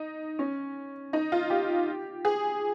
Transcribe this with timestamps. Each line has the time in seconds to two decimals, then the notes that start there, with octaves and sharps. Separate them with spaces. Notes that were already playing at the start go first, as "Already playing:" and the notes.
Already playing: D#4
0.39 C#4
1.13 D#4
1.32 F4
1.50 G4
2.25 G#4